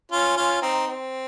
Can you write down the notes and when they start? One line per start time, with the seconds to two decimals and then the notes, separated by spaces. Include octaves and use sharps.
0.12 C#4 F4
0.37 C#4 F4
0.62 C4 D#4
0.87 C4